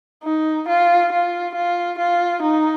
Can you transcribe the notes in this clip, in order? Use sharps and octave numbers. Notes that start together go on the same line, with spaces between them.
D#4
F4
F4
F4
F4
D#4